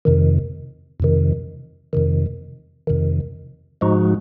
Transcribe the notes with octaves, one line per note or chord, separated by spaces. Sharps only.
F2 C3 D#3
F2 C3 D#3
F2 C3 D#3
F2 C3 D#3
G#2 F3 G#3 D#4 F#4